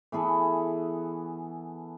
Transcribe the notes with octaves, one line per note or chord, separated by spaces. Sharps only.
E3 B3 G#4 A4